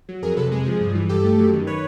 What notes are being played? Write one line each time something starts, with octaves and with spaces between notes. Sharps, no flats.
F#3
F2 G#4 A#4
C3 A4 B4
G#3 G#4
F3
G2
E3
G2 G4 A4
A3
F#2
D#3
B4 C#5